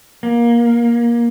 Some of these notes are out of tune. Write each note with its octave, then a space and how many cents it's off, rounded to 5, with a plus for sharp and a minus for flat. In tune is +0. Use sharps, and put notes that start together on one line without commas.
A#3 +20